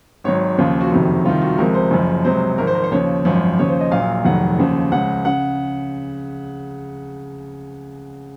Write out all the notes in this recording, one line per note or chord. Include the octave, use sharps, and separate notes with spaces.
G#1 G#2 F#3 C#5
D#2 C#3 F3 F4
F#4
F#1 F2 C3 D#3 F#4
C2 C3 D#3 F4
F#4
C#2 C3 F3 A#4
C5
F#1 F#2 F3
C#2 C3 F#3 C5
G#1 G#2 F3 A#4
C5
A#4
C5
D#2 C#3 F3 C#5
G#1 F#2 F3
D#2 C#3 F3 C#5
C5
D#5
A#1 A#2 F#3 F5
F1 F2 D#3 F#3 F#5
D#2 C#3 F3
C#2 C#3 F3 F#5
C#3 F#5